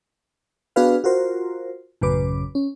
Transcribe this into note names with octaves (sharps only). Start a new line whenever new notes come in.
B3 D4 F#4 G#4 B4 F5
F4 F#4 A#4 C5
A1 F#2 C#3 B4 D6
C#4